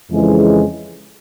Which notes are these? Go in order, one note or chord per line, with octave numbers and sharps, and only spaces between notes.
F2 C#3 E3 G#3